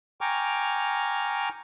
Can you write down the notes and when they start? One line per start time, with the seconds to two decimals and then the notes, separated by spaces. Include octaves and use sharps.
0.21 G5 G#5 A#5 C#6 D6 F6